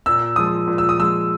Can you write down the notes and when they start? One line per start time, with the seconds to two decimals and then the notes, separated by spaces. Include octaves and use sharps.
0.06 A#2 E6
0.36 F3 G#3 D#6
0.67 A#2
0.78 E6
0.89 D#6
0.99 F3 G#3 E6